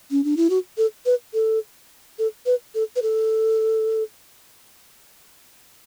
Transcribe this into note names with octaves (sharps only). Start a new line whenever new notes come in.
C#4
D4
E4
F#4
A4
B4
A4
A4
B4
A4
B4
A4